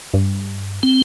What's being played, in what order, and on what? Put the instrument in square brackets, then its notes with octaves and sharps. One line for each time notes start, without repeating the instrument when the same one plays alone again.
[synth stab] G2
[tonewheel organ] C4